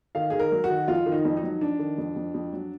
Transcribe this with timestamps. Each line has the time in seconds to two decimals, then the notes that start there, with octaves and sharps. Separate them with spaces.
0.15 D#3 F5
0.30 D#3 G#4
0.40 A#4
0.52 F#3
0.64 F#4
0.70 D#3
0.88 F2 F4
1.06 D#3
1.12 D#4
1.25 F2
1.37 D#4
1.43 F#3
1.61 F2 D4
1.79 D#3
1.98 F2
2.16 F2
2.34 F2
2.53 F#3